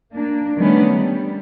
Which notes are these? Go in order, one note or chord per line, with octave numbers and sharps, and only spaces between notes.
A#3 D4
D#3 G3 A3 B3 C#4 D4
G3